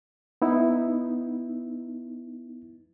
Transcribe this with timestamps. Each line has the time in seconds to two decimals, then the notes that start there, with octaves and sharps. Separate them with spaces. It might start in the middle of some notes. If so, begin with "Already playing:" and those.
0.42 B3 D#4 E4